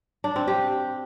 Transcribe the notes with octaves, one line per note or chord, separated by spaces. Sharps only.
D4
C4
G4